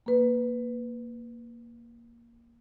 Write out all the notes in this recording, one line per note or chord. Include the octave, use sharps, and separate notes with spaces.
A#3 B4